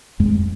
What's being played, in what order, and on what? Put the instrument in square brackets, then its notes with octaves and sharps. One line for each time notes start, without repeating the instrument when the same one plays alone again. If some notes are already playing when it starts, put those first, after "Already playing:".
[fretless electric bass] F2 G#3